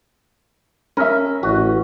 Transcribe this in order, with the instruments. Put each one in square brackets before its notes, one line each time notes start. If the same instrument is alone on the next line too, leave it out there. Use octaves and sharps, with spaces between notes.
[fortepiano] C#4 E5 [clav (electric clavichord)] A#4
[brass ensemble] A1 [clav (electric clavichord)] F#4